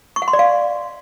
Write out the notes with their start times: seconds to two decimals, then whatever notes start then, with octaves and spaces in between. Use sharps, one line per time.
0.16 C#6
0.22 F#5
0.28 C6
0.33 D5
0.39 F5